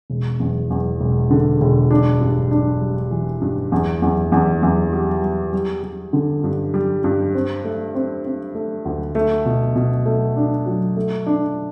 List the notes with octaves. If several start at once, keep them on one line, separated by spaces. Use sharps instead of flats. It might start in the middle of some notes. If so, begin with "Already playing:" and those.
E1
E2
E2
E1
D3
E1
D4
G2
D4
G3
E3
G2
E2
E2
E2
E2
G3
G3
G3
G3
D3
G2
G3
G2
C4
A3
C4
C4
A3
D2
A3
B2
B2
A3
D4
F#3
A3
D4